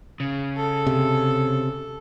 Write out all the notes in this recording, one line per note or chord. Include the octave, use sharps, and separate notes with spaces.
C#3
A4
C3